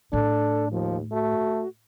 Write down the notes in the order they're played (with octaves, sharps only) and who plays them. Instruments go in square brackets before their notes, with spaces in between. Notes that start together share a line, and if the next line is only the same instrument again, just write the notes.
[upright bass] A2 [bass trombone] D4 [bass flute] A4
[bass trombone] D#2 [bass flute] F3
[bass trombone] A3 [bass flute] F#4